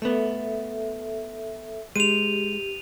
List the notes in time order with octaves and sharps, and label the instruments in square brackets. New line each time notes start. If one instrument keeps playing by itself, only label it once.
[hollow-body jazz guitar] A3 B3 [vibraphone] A4 E5
[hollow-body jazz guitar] G#3 [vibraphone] G4 [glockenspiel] D#7 F7